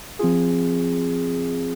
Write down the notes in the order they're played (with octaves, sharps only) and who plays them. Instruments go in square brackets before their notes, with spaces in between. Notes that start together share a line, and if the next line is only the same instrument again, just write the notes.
[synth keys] F3 C4 F4 G#4